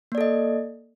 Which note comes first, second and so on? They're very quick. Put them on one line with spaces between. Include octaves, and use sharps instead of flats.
A#3 D5 A4 D#5